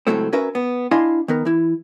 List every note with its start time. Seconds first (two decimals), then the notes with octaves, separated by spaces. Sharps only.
0.07 C#2 A2 F#3 A3 C4
0.33 C#4 F#4 A#4 B4 E5
0.55 B3
0.91 D4 E4 D#5 F5 G#5 C6
1.28 D#3 B3 A#4
1.45 E3 E4